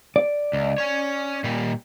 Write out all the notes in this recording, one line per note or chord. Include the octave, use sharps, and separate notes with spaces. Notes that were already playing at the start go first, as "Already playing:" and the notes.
D5
C#2
C#4 C#5
A#2 G3